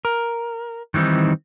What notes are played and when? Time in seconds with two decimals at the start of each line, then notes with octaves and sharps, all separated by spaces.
0.05 A#4
0.94 D#3 E3 G3 C4 D#4